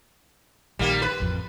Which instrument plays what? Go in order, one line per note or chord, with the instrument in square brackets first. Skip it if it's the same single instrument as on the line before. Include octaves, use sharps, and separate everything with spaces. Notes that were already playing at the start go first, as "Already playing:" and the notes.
[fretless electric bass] A#1 D#3 [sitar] G3 A#3
[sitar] B4
[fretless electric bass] A1 F2